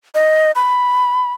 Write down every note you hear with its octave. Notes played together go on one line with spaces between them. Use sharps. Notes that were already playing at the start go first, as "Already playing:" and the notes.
D#5
B5